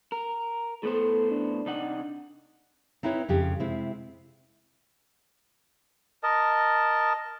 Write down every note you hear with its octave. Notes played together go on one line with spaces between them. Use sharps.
A#4
A2 B3 A4 C5
D4
C3 D#4 F#5
C4 D#4 E4 B4 C#5
F2 C#3 G4
C3 G#3 C4 E4
A#4 D#5 A5